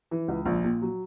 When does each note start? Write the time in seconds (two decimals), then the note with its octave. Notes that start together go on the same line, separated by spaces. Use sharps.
0.11 E3
0.28 C#2
0.46 A#1
0.64 A#2
0.82 F#3